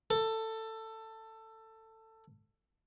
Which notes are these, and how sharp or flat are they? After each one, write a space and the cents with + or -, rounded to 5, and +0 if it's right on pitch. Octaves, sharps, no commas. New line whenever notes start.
A4 +15